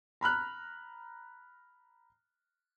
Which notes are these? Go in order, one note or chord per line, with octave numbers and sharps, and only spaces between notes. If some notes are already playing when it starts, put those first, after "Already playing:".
A#5 B5 F6 F#6